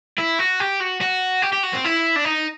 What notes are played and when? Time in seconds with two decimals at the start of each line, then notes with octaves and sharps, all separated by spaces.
0.18 E4
0.39 F#4
0.60 G4
0.80 F#4
1.01 F#4
1.42 G4
1.53 G4
1.63 F#4
1.73 C4
1.84 E4
2.16 D4
2.25 D#4